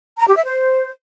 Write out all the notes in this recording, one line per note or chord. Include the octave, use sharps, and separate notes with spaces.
A#5
G4
E5
C5